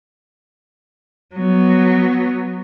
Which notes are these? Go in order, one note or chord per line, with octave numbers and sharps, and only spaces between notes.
F#3 B3